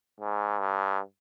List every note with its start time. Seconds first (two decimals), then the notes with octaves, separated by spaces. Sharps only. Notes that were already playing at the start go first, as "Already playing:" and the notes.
0.21 G#2
0.59 G2